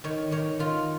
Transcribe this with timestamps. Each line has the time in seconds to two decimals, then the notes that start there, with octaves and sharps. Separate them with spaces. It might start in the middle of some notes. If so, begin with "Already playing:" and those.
0.04 D#3 C#5
0.31 D#3 C#5
0.59 D#3 F4